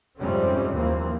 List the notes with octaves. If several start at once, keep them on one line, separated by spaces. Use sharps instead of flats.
F2 G#2 C3 G3 C4 C#4
D#2 E3 F3 A#3 C4